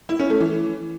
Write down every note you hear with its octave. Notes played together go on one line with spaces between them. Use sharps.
E4
C#4
A3
E3